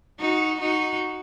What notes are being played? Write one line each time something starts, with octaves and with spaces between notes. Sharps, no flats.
D#4 F#4
D#4 F#4